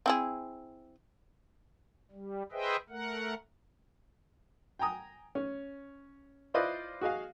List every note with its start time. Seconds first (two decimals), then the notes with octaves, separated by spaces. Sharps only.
0.06 C4 E4 G#4
2.11 G3
2.52 G#4 B4 C5 D#5 E5 G5
2.90 A3 A#4 F#5
4.79 G5 G#5 A#5 D#6
5.35 C#4
6.54 E4 F4 B4 C5 D5 D#5
7.01 F#4 G#4 D#5 F5